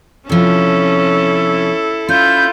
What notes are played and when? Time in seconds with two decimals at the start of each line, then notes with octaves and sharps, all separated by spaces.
0.29 C3 F3 C#4 E4 A4
2.09 C#4 F4 B5 G6